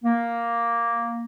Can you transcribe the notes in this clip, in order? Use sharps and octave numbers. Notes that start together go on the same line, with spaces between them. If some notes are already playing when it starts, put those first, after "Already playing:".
A#3